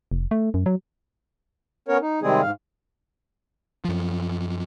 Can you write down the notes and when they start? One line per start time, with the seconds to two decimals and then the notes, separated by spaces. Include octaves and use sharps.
0.12 F1
0.31 A3
0.54 F#2
0.66 F#3
1.88 B3 C#4 A#4 C#5
2.02 D#4
2.23 C3 D#3 G3 G#3 C4 G#4
2.42 G#2 F5
3.85 F#2 F3